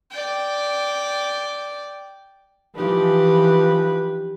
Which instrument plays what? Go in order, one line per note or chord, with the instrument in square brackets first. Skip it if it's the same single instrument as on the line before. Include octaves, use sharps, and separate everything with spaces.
[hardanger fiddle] D5 G5
[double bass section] E3 F3 [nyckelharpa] D#4 G4 [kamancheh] B4